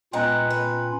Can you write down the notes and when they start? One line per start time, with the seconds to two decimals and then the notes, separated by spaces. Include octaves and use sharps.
0.13 A#2 G#3 B3 C#4 F4 G5 A#5 F#6
0.50 B4